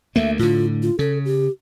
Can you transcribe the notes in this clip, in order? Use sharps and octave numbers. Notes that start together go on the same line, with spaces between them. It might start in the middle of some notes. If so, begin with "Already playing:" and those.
D2 A3 A#3 E5
A2 D3 F4
F4
C#3 A4
G4